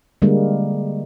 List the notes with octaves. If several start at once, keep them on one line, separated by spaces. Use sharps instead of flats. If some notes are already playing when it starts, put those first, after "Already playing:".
D3 G3 G#3 A#3